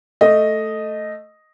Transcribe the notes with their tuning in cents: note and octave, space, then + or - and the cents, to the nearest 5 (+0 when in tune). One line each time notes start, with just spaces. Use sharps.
A3 +0 D#5 +0